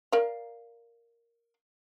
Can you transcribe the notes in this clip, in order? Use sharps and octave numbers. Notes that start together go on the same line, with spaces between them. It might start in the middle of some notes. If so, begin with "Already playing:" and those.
A#4 D5 F5